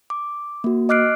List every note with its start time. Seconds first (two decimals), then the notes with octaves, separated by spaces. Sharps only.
0.10 D6
0.64 A#3 F#4
0.89 D#5 D6 F6 F#6 C7 D7